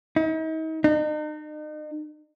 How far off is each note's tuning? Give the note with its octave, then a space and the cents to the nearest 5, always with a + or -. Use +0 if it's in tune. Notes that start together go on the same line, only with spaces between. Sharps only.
D#4 +40
D#4 -40